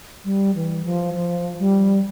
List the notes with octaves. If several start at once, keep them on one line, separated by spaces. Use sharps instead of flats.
G3
E3
F3
F3
G3